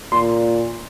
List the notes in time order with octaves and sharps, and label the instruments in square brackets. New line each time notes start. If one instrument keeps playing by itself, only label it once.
[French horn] A#2 [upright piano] C6